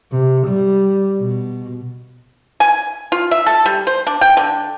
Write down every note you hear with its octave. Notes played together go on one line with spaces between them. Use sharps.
C3
G3
B2
G#5
F4
E5
A4
G3
C5
D4
G5
D3